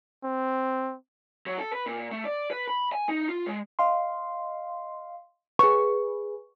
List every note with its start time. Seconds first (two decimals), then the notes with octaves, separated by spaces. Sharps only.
0.24 C4
1.46 F#3
1.58 A4
1.73 B4
1.86 A#2
2.12 A3
2.25 D5
2.50 B4
2.68 B5
2.92 G#5
3.09 D#4
3.29 F4
3.46 G#3
3.79 D#5 F5 C6
5.59 G#4 B4 C#6